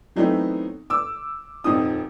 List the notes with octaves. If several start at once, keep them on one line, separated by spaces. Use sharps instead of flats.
E3 F#3 A3 B3 C4 D#4
D6 E6
D#1 F2 C4 D#4 D#6